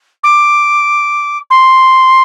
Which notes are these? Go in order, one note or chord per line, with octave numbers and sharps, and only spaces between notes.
D6
C6